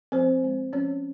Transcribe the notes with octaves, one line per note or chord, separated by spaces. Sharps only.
F3 C4 C5
G#3 C4
F3 C#4 C#5